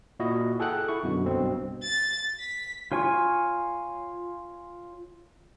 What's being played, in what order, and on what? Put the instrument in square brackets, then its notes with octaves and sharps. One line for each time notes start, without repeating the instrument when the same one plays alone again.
[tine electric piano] A#2 E4 F#4 D#5
G#4 A4 F#5 G5 F#6
E4 C#6
F#2 B2 D3
B1 G2 B2 C4
[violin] A6
B6
[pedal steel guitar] F4 C#5 G#5 C#6